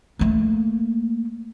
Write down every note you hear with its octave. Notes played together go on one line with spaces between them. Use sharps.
A3 A#3